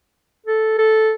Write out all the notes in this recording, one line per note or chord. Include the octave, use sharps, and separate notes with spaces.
A4
A4